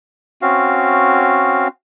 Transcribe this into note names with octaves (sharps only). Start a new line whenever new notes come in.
C4 C#4 F#4 F5